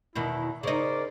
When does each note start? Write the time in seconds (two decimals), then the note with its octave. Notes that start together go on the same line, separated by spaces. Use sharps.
0.15 E2 B2 D#3 E4
0.63 C#3 D#4 A#4 C5 D5